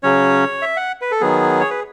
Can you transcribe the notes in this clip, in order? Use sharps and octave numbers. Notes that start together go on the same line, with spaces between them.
C#3 F#3 C#4 C#5
E5
F#5
B4
A4
D#3 F#3 B3 G#4
C#5
B4